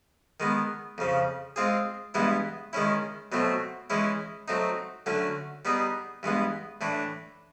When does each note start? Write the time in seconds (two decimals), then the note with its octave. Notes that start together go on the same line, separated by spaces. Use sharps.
0.40 D#3 G#3 B3
0.98 F2 C#3 F3
1.56 G#3 C4 F4 G#4
2.14 G2 E3 G#3 B3 E4
2.73 D#3 G#3 C#4 E4
3.32 B2 F#3 A3 C4
3.90 E3 G#3 C#4 E4
4.48 F#3 A3 C4 D#4
5.06 D3 F#3 A3 C#4
5.65 G3 B3 D#4 G#4
6.23 G2 E3 G#3 B3
6.81 A2 E3 A3 D4